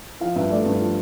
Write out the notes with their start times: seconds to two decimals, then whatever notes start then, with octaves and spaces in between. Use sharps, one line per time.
0.21 F3 F5
0.36 G2 E5
0.51 A3 D5
0.65 G2
0.81 F3